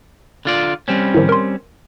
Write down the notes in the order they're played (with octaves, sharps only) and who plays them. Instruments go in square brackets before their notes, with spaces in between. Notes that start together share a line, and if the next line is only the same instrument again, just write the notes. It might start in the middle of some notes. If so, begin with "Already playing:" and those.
[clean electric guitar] D3 F4 D5
G3 C4 C#4
[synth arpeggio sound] A2 D#3 F3
A#4 C6